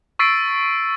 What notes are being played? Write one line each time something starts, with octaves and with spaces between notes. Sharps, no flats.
C#6 E6 A6 B6 C7 D7